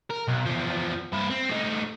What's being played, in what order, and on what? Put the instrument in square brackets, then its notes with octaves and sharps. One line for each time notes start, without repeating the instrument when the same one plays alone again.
[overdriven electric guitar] A#4
B1
E2 F3
G2 E4
C4
A2 D#4